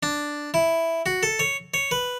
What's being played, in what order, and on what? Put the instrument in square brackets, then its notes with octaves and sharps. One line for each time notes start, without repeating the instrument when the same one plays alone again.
[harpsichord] D4
E4
F#4
A4
C#5
C#5
B4